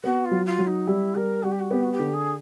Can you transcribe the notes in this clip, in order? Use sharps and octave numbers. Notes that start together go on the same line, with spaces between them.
B3 F#4
F4
F#3
F4
F#3
D#4
G3 E4
G3 A#4
G3 F#4
G4
F#4
B3 G4
F#4
G4
D3
G#4